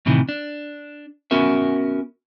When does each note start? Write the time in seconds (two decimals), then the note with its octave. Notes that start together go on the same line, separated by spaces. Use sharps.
0.06 A2 C3 D#3 E3
0.29 D4
1.31 B3 C#4 F#4 A#4 E5